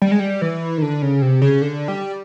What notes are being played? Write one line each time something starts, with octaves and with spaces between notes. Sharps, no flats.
G3
G#3
G3
E3
D#3
D3
C#3
C3
C#3
D3
G3